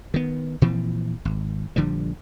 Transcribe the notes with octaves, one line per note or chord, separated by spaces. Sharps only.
D#3 B3
A#2 E3 F3 C4
G#1
A#1 D3 F3 G3